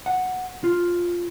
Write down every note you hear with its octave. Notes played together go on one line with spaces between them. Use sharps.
F#5
F4